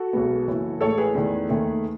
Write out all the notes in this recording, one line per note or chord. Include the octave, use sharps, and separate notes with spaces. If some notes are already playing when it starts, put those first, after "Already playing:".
Already playing: F#4 A4
B1 B2 G#3 B3
F#1 F#2 E3
A1 A2 G#3 A4 C#5
G#4 B4
E2 D#3 A3
D#2 D#3 A3